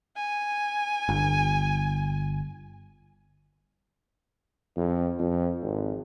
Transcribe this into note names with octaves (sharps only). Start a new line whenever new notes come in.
G#5
G1
F2
F2
G#1